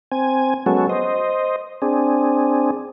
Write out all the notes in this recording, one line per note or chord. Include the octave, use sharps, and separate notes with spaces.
C4 G#5
F#3 G#3 B3 C#4 F#4 A4
C5 D#5
C4 D4 G#4